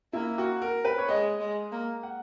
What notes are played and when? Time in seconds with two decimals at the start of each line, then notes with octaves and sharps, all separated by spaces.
0.13 A#3 E4
0.38 F#4
0.62 A#4
0.85 B4
0.98 C#5
1.08 G#3 D#5
1.40 G#3
1.72 A#3
2.03 F#5